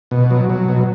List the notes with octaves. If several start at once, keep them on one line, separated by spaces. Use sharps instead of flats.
B2
F#3
F#3
B2